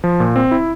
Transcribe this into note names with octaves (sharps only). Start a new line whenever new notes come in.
F3
A#2
C4
E4